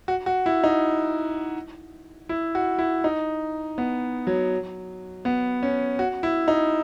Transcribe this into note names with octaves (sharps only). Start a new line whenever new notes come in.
F#4
F#4
E4
D#4
E4
F#4
E4
D#4
B3
F#3
B3
C#4
F#4
E4
D#4